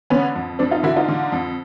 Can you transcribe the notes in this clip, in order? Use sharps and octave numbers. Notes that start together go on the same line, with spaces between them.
D3 B3 C#4
F2
F2 C4 D4
D#4 F4
D3 E4 F#4
D#4 F4
D3
F2